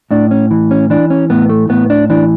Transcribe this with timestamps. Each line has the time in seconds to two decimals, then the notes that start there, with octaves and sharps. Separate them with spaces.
0.11 A2 D4
0.31 C#4
0.51 E3
0.71 C#4
0.90 E3 D4
1.10 C#4
1.30 A2 B3
1.49 A3
1.69 A2 B3
1.90 D4
2.10 E3 D4